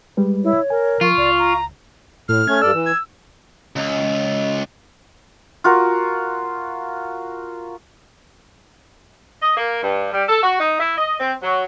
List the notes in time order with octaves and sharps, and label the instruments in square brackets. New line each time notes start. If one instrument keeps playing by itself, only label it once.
[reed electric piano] G3 G#3 B4
[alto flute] E4 [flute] C#5
[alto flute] A#4 [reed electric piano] G#5
[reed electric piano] F3 [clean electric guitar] F4 [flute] C#6
[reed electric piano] C#2 [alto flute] D5
[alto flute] A#5
[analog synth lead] A2 [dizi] F6
[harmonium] A3 C#4 [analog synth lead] G#6
[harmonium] G2 A4 D5 [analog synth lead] E6
[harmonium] E3
[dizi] G#6
[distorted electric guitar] C#2
[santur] F4 F#4 A#4
[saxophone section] D#5
A#3
G2
G3
A4
F#4
D#4
E4
D#5
C4
F#3